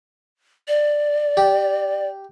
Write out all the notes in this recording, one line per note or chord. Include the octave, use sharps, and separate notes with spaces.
D5
G4